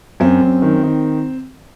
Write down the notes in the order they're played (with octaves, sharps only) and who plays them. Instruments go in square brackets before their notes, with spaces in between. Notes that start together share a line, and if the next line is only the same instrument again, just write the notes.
[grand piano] F#2 [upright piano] C4
[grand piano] F#2
D#3
D#3